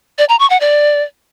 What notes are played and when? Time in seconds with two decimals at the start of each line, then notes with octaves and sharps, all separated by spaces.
0.18 D5
0.29 A#5
0.39 C#6
0.50 F#5
0.60 D5